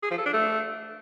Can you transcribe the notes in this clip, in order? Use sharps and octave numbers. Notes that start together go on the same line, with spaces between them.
G#4
F3
A4
D4
A3